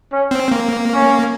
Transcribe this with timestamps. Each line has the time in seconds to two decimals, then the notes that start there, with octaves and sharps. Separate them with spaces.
0.11 C#4
0.31 C4
0.51 A#3
0.92 C#4